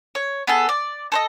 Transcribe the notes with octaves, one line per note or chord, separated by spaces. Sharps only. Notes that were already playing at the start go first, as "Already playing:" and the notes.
C#5
B3 G#4 A4
D5
A4 C5 D#5